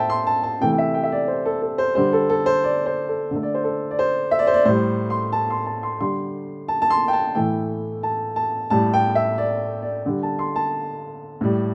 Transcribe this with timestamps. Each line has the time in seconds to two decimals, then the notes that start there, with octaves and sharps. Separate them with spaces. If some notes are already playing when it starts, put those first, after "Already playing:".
Already playing: A2 C5 E5 G5 A5
0.10 C6
0.27 A5
0.43 A5
0.60 C3 E3 A3 G5
0.72 G5
0.78 E5
0.94 G5
1.03 E5
1.12 D5
1.28 C5
1.45 A4
1.62 A4
1.78 C5
1.95 D3 G3 C5
2.13 A4
2.30 A4
2.46 C5
2.64 D5
2.86 C5
3.08 A4
3.31 D3 A3
3.43 D5
3.54 C5
3.64 A4
3.91 D5
3.99 C5
4.31 E5
4.39 D5
4.47 C5
4.54 D5
4.65 A2 G3 C5
5.10 C6
5.33 A5
5.50 C6
5.66 A5
5.83 C6
6.00 D3 G3 C6
6.68 A5
6.82 A5
6.90 C6
7.08 G5
7.13 A5
7.35 A2 E3 A3 G5
8.03 A5
8.36 A5
8.70 A2 G3 A5
8.94 G5
9.15 E5
9.38 D5
9.82 D5
10.06 D3 G3
10.23 A5
10.39 C6
10.56 A5
11.41 A2 G3